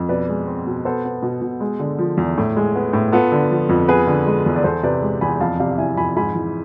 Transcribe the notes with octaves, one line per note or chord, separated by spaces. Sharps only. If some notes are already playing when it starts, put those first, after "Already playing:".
Already playing: F2
B2 B4 D5
G#3
C4
B2
B3 A4 C5
B3
B2
B2
G#3
D3
F3
E2
A2
G#3
B3
A2
B3 F4 A4
D3
F3
F2
B3 G#4 B4
D3
G#3
E2
D5
E2 A4 C5
C3 B4 D5
G#3
E2 G#5 B5
F2 F5 A5
C3 D5 F5
F5
E3 E5 G#5
F2 G#5 B5
G#2 G#5 B5
E3